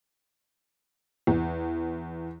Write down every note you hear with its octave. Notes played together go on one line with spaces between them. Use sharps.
E2